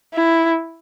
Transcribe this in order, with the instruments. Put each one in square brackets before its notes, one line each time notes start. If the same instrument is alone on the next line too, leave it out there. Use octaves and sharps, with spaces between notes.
[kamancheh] E4